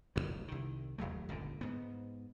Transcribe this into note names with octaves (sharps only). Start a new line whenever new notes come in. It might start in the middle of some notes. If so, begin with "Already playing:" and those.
E1 A1 F2 F#3
C2 D#3
D#1 G#1 F#3 A3
G1 C#2 A#2 D3
G#2 B3